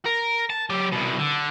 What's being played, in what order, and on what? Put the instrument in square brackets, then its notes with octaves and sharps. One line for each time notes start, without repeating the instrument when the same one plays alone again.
[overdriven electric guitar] A#4
A5
F#3 G4
C2 B2
D3